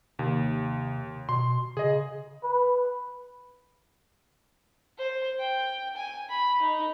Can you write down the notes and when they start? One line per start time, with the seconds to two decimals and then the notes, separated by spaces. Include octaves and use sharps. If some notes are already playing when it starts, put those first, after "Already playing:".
0.19 D#2 C3
1.29 B2 C6
1.77 C#3 G#4 D#5
2.44 B4
4.98 C5
5.39 G5
5.96 G#5
6.29 B5
6.62 D#4